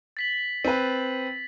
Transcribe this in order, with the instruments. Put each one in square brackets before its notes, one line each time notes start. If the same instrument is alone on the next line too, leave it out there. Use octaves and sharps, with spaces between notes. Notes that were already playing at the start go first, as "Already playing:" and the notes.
[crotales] A6 B6 F#7
[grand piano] C4 B4